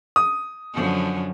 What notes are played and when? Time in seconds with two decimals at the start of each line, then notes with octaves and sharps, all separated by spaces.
0.16 D#6
0.74 F#2 D3 F3